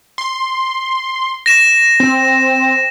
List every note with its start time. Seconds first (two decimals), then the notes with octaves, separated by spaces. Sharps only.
0.18 C6
1.46 A#6 E7
2.00 C4